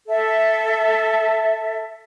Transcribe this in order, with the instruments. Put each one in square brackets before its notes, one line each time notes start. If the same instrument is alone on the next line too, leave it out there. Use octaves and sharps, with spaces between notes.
[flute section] A4 E5